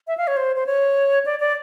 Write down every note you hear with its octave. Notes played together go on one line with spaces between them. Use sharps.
E5
F5
C#5
C5
C5
C#5
D5
D5